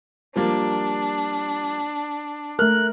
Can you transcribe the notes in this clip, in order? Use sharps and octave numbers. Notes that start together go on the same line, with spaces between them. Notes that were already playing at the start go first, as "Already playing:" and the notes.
F3 G3 A#3 D4
A3 A#4 F6 F#6